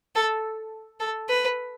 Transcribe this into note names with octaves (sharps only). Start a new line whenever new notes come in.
A4
A4
B4